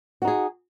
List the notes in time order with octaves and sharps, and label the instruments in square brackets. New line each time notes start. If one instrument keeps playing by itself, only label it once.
[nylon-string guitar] F#4
D#4
G#4